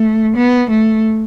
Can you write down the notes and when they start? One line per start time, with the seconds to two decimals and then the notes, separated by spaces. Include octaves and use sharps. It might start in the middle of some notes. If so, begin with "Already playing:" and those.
Already playing: A3
0.37 B3
0.70 A3